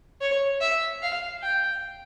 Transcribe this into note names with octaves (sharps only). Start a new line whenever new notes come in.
C#5
E5
F5
G5